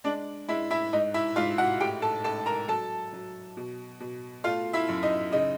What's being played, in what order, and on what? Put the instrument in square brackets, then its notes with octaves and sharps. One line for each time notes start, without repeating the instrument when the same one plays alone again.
[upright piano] G#3 D4 D5
G#3 E4 E5
E4 E5
G#2 D#4 D#5
E4 E5
G#2 F4 F5
F#4 F#5
A2 G4 G5
A4 A5
A2 A4 A5
A#4 A#5
F#3 A4 A5
F#3
B2
B2
A3 F4 F5
E4 E5
F#2
D#4 D#5
C#3 D#4 D#5